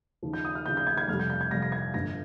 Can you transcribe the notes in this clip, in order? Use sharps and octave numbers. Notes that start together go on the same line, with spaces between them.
D#2 C#3 F3
G6
D#6
F6
D#2 C#3 F3 G6
G6
G#6
G#6
F2 C3 G3 F6
G6
G6
G#6
F2 C3 G3 A#6
A#6
G#6
G1 G2 F3 A#6